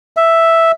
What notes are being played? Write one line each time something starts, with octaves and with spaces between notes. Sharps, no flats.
E5